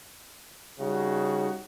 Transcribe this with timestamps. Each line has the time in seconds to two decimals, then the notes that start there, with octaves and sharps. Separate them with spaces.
0.80 C#3 G3 D#4 F#4